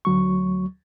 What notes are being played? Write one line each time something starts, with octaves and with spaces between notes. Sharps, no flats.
D2 F#3 C#6